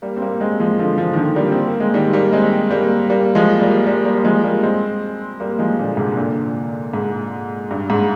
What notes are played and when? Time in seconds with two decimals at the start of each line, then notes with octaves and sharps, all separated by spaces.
0.02 G3 A#3
0.17 C4
0.22 G3 A#3
0.40 G#3 C4
0.60 F3 G#3
0.79 D3 F3
0.98 D3 F3
1.13 D#3
1.17 D3 F3
1.36 G3 A#3
1.52 C4
1.67 A#3
1.80 G#3
1.94 D#3 G3
2.13 G3 A#3
2.33 G#3 C4
2.71 G3 A#3
3.10 G3 A#3
3.35 F3 G#3
3.61 G3 A#3
3.86 G3 A#3
4.05 G3 A#3
4.24 F3 G#3
4.44 G3 A#3
4.63 G#3 C4
5.40 G3 A#3
5.59 F3 G#3
5.79 A#2 D3
5.97 G#2 C3
6.17 A#2 D3
6.93 G#2
7.71 G2
7.90 G#2